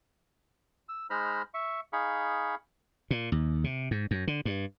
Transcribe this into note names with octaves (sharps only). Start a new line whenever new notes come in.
E6
G#3 D#4 C5 A#5 B5 F6
E5 C#6
D#4 G#4 F5 B5 C#6
A#2
D#2
C3
G#2
F#2
D3
G2